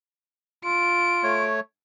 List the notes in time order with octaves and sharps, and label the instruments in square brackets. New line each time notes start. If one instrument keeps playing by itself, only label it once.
[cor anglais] F4 [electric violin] D7
[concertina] A3 C#5